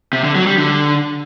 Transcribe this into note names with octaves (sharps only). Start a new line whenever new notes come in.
C3
D3
F#3
G3
D3